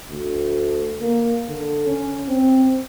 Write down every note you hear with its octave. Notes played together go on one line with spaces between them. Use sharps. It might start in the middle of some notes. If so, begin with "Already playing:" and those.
D2
A#3
D3
C#4
C4